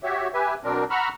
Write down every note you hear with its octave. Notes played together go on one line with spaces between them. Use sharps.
F#4 G4 C#5 E5
G4 B4 E5 G#5
B2 F#3 C4 D4 A#4
F#5 A#5 B5 C#6 E6 F6